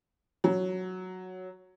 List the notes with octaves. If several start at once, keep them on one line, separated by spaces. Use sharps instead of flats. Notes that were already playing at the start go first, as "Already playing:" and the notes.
F#3